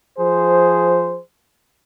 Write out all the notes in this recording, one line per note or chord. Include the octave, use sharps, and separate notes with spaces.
F3 G#4 C5